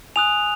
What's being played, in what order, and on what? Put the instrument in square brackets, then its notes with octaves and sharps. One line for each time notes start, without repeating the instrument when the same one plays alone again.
[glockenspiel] G#5 D#6 F#6 F7